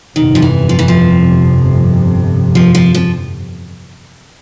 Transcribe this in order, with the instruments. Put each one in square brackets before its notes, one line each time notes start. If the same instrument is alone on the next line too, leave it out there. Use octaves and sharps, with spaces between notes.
[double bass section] G1 F2 C3 [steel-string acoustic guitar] D#3
[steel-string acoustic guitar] F3
E3
F3
E3
F3
F3
F3
F3